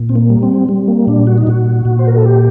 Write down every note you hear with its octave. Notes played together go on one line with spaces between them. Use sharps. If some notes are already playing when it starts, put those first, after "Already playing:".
Already playing: A#2
C4
A#3
G3
C4
G3
A#3
A#2 D4
F#4
D#4
A#2 F#4
A#2
C5
A#4
A4
G4